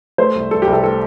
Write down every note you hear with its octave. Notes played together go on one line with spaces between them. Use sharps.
A3 C5
C2
C2 A4
G4
C2
A4
A3 A4